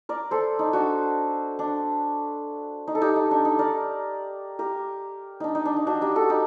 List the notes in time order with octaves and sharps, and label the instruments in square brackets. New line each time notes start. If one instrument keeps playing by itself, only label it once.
[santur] A#4 D5
A4 C5
D#4
D4 F#4
D4
D#4
A4
D#4 G4
D#4
D4
D#4
A#4 D5
G4 A#4
D4 D#4
D#4
D4
D#4
D4 F#4
D#4 G4
F#4 A4
D#4 G4